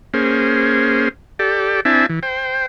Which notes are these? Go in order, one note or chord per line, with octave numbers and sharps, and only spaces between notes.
A#3 C#4 G#4 C5
G4 A4 D5
C4 D4 E4 E5 G#5 A5
E3
C5 G5